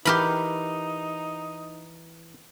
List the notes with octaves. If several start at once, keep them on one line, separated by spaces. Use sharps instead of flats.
E3 D#4 G4 A#4 B5